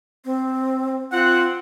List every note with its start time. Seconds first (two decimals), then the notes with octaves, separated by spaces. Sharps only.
0.25 C4
1.12 C4 F4 F#5